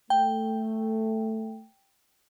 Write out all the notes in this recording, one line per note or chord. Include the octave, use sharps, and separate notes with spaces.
A3 G5